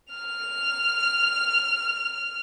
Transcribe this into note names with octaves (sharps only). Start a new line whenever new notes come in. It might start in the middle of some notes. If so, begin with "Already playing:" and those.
F6 F7